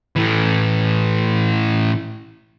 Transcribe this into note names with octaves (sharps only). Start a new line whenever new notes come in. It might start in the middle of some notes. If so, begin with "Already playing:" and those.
A2 E3